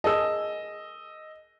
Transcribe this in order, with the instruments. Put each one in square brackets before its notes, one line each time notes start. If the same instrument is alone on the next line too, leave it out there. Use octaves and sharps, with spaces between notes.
[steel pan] G#4 A#4 A5 [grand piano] D#5 E6